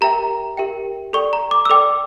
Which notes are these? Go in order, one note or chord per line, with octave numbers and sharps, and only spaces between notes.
G4 A#4 E5 G5 A#5
G4 A#4 E5 G5
A4 D5 G5 C#6
A#5
D6
E6
A4 D5 G5 D6